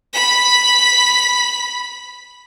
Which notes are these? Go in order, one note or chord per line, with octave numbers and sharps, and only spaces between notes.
B5 B6